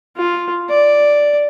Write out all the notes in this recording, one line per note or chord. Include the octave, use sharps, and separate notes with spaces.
F4
D5